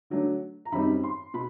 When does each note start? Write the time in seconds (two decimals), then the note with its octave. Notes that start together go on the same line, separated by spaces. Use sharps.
0.10 D3 F#3 A3 D4
0.65 A#5
0.72 F#2 D#3 G3 C4 D#4 B5
1.04 C6
1.34 B2 B5